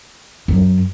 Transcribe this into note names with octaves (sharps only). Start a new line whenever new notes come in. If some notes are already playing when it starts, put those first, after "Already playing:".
F#2